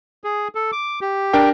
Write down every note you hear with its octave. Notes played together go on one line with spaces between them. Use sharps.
G#4
A4
D6
G4
D4 A#4 G5